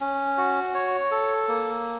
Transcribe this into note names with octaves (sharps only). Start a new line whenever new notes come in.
C#4
F#4
C#5
A4
A#3